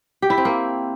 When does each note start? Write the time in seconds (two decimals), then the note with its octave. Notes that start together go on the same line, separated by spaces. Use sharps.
0.22 G4
0.30 E4
0.38 C4
0.45 A#3